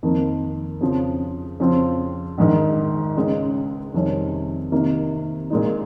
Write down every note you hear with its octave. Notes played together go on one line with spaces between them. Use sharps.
F2 D#3 A#3
F2 C#3 F3
F2 C#3 F3 C4 F4
A#1 G#2 D#3
C#2 C#3 G#3 D#4
F2 C3 D#3 G3 C#4
C3 D#3 A#3
A#2 G#3 D#4